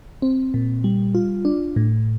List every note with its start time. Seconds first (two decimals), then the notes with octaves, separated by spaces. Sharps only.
0.22 C4
0.54 A#2
0.84 G3
1.15 F4
1.45 D4
1.76 A2